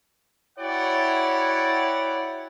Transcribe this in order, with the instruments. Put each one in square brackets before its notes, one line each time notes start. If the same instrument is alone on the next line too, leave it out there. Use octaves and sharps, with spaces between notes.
[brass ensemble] E4 F#4 C#5 D5 F#5 G5